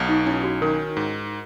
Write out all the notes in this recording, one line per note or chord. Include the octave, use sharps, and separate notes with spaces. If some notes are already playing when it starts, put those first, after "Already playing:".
Already playing: B1 B2
D#4
C#4 E4
F#4
D#3 A#4
G#2